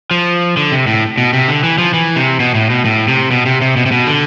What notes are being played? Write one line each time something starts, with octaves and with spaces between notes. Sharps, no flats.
F3
D3
C3
A2
B2
C3
D3
E3
F3
E3
C3
B2
A2
B2
A2
C3
B2
C3
C3
B2
C3
B2
D3